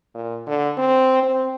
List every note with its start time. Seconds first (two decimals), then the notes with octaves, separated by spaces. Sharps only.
0.14 A#2
0.47 D3
0.77 C4
1.23 C4